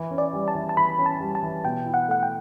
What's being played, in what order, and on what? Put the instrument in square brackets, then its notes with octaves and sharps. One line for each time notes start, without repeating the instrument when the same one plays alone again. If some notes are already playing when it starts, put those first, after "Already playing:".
Already playing: [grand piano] E3
C#4
[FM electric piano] D5
[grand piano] G3
[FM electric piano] A5
[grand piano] E3
[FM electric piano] A5
[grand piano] E3 [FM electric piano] B5
[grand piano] C#4
[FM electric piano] A5
[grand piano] G3
[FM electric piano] A5
[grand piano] E3
[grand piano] B2 [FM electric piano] G5
[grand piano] E4
[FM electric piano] F#5
[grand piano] A3 [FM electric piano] F#5
[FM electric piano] G5